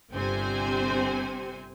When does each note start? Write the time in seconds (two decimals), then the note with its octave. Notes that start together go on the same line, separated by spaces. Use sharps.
0.12 G1 C3 C4 C5 G#5